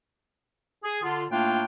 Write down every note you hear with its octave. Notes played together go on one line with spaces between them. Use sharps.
G#4
D3 F4
A2 A3 A#3 D4 F4 G5